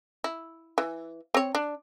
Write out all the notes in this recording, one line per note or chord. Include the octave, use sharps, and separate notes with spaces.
E4
E3
C4 C#5
D4